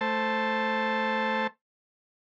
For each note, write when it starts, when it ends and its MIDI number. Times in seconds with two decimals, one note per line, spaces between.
0.01 1.47 57
0.01 1.47 72
0.01 1.47 81